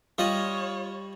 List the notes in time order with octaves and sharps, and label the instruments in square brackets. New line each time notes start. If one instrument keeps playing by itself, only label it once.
[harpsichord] G3 D#5 [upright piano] F4 [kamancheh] C#5